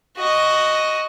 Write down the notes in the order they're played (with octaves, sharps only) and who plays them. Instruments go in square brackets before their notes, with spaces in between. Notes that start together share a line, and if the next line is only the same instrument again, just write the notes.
[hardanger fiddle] F#4 D#5